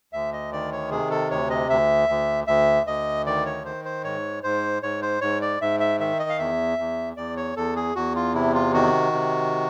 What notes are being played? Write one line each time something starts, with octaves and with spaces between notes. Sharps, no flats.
D2 E5
D#5
D#3 D5
C#5
C3 G#4
A4
D2 C#5
D#5
D2 E5
D2
D2 E5
D2 D#5
D#3 D5
C#5
D#3 C5
C5
G#2 C#5
G#2 C5
G#2 C#5
C5
G#2 C#5
D5
G#2 E5
E5
D#3 E5
D#5
F5
E2 E5
E2
E2 D5
C#5
E2 A4
G#4
E2 F#4
F4
C3 E4
F4
D#3 F#4
C3